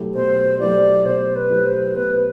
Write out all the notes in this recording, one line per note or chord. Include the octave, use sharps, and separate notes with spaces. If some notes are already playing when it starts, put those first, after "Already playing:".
Already playing: B2 F#3 A3 E4 G4
B2 C5
F#3 A3 E4 G4 D5
B2 C5
B4
F#3 A3 E4 G4
C5
B2 B4